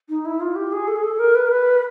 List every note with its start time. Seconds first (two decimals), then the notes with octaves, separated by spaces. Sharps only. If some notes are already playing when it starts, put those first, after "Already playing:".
0.09 D#4
0.25 E4
0.41 F4
0.56 G4
0.72 G#4
0.88 A4
0.96 G#4
1.04 A4
1.19 A#4
1.35 B4
1.46 A#4
1.51 B4